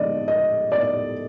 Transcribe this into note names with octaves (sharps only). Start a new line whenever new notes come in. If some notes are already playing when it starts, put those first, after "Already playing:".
Already playing: D3 F3 G#3 D5 D#5
D#5
D5